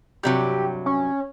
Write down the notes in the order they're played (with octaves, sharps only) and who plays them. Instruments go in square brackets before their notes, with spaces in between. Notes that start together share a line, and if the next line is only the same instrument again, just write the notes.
[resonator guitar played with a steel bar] G2 C3 F#3 [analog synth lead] G4
[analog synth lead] C#4